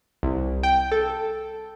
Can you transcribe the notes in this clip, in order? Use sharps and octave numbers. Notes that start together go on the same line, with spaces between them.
C2
G5
A4